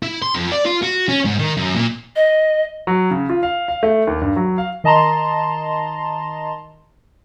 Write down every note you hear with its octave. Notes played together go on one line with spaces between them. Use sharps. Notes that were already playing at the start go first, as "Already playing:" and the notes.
E4
C6
F2
D5
F4
F#4
C#4
G#2
D#3
F#2
A#2
D#5
F#3
C#3
F4
F5
F5
A3
D#2
G2
F#3
F5
D#3 D#5 A5 A#5 C6